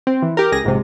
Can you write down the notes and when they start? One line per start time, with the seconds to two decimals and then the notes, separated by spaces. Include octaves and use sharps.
0.07 C4
0.22 E3
0.37 G4 A#4
0.52 C#2 G#4 A#6
0.63 A#1 G#2 C3